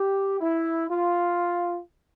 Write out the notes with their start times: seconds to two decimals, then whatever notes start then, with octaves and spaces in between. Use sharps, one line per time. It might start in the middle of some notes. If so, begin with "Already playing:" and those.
Already playing: G4
0.41 E4
0.90 F4